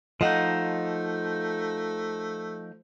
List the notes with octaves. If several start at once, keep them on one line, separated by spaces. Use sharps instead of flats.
F3 A3 D#4 D#5 F5 F#5